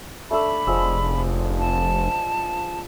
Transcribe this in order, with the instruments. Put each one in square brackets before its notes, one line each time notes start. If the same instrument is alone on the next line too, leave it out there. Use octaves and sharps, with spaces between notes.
[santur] A3 D4 A4 [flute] B5
[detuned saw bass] F1 [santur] F3 G#3 E6
[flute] A5